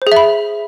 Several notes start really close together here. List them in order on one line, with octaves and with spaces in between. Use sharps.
C5 G#4 E5 B5